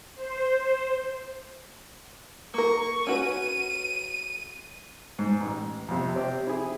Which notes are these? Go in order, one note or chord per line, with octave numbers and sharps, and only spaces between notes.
C5
A#3 A#4 C#6
C#4 F#4 B4 D#7
G#2
A1
F2 C3
C3 C4 G4
E4 G#4